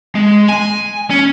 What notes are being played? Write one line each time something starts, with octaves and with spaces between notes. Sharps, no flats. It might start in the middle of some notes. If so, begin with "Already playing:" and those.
G#3
G#5
C#4